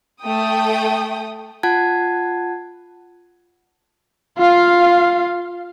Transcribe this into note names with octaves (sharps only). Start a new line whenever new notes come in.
A3 G5 D#6
F4 F#5 A5 G#6
F4 F5